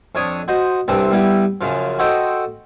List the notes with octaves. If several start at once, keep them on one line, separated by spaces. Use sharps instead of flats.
F2 D4 C#5 D#6
F#4 C5 D#5
C2 C3 E3 C4 D4 A5
G3 B3 E4 G4
F#2 C#3 F3
F#4 A4 C5 D#5 G5